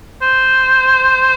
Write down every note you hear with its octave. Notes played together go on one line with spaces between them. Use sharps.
C5